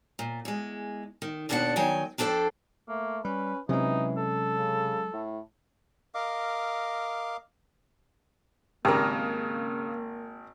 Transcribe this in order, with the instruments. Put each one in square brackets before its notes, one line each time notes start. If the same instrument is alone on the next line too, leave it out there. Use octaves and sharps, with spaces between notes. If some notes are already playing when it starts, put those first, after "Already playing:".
[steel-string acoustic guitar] A#2
E2 G#3
D#3
D#2 B2 A#3 D4 G4 F#5
D#3 F#3 G5 G#5
F2 D4 A4 C5 G5
[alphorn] A3 [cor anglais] A#3
[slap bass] G3 [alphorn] C#4 [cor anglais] B4
[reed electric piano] C3 C#4 [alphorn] E3 [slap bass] F#3 G#3 [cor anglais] D#4
[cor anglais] A4
[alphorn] C#3
A2
[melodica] A#4 D#5 F5 D6
[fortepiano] G#1 [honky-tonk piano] C#3 [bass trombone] A#3 [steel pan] G4 A#4